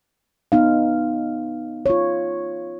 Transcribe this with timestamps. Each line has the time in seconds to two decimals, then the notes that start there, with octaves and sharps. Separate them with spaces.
0.52 B3 D#4 F5
1.86 F4 C#5